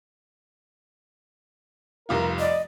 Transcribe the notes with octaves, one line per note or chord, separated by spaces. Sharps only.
F1 C2 F4 A#4
D5 D#5